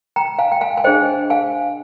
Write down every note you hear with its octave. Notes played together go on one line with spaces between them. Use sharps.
G5 A#5
F5 G#5
G5
F5 G#5
G#5
D4 G#4 C5 D#5 G5
F5 G#5